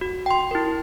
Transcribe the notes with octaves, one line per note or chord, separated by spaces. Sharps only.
F#4
G5 C6
E4 A#4